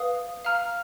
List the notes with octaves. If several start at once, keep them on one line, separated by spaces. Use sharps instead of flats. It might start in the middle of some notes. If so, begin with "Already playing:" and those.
Already playing: B4 F5 D#6
F5 A#5 F6